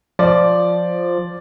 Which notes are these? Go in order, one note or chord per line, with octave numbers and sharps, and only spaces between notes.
F3 D5 D6